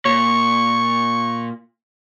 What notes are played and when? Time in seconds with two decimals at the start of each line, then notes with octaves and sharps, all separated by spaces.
0.05 A#2 C#6